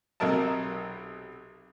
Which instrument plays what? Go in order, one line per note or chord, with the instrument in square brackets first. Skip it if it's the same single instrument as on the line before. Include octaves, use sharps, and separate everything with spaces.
[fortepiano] B1 C3 F#3 A#4 D#5 A5